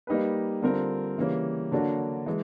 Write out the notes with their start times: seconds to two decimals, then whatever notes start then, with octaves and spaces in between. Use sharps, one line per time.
0.07 G3 A#3 D#4 G4 B4
0.62 D3 G3 C4 F4 A#4
1.17 C#3 E3 G3 A#3 C#4
1.71 D3 F#3 A#3 D4 F#4
2.26 E3 G#3